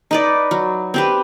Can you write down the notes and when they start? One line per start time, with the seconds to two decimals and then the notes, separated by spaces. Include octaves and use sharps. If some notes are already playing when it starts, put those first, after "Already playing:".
0.11 D#4 B4 D5
0.51 F#3
0.94 C4 G4 B4